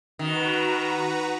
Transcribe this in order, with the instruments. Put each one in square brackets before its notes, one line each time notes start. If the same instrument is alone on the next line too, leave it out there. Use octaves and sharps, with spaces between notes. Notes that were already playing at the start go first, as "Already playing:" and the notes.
[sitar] D#3 [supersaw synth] F#4 B4 A#5